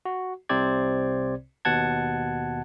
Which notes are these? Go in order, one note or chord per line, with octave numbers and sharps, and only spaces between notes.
F#4
C2 C3 C4 C5 D5 G#6
D#2 B2 F#5 A5 G#6